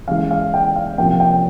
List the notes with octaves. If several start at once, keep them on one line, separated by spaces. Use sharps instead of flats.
C#3 E3 G#3 F5
F5
G5
F5
C3 F3 A#3 G5
G5